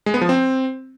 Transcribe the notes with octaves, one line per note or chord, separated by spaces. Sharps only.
G#3
B3
F3
C4